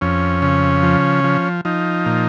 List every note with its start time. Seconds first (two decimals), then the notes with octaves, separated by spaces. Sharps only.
0.01 F2 C#4
0.42 C#3
0.83 F3
1.24 F3
1.65 F3 D#4
2.06 A#2